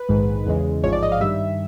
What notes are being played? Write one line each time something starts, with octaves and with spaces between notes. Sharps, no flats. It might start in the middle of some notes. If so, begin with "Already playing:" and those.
Already playing: B4
A#1 G#2 D#3 G#3
E2 C#3 E3 G#3
A1 G#2 F3 G#3 C#5
D5
D#5
F5
G2 D#3 G3 E5